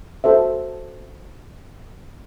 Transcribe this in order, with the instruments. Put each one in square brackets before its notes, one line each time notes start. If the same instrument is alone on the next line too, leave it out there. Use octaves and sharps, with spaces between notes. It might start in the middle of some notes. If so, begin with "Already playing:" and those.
[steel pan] F#4 A4 C5 E5